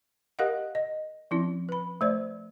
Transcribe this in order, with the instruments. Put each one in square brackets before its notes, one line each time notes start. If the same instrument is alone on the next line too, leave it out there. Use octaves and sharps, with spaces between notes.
[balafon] G4 A#4 D#5 F5 F#5
D#5
F3 C4 C#4 E4
B4 B5
A3 C5 D5